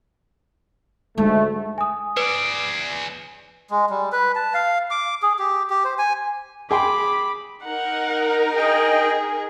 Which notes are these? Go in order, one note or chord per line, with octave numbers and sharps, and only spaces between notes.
D2 G#2 G#3 A3
G#5 D#6
G#4 B4 D5
G#3
G3
B4
A5
F5
D6
G#4
G4
G4
C5
G#5
G#4 G5 B5 C6 D6
D#4 A#4 F#5
G#4 D#5 G5